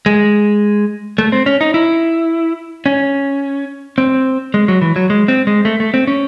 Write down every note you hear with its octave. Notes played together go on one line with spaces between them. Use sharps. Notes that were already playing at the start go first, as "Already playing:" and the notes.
G#3
A3
C4
C#4
D#4
E4
C#4
C4
G#3
F#3
E3
F#3
G#3
C4
G#3
A3
A3
C4
C#4